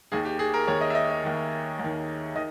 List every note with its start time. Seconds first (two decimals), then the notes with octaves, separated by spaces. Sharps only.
0.12 D#2 D#3 G#4
0.25 G4
0.39 G#4
0.54 A#4
0.68 D#2 D#3 C#5
0.81 D#5
0.90 E5
0.95 D#5
1.10 D#5
1.23 D#2 D#3
1.79 D#2 D#3
2.35 D#3 D#5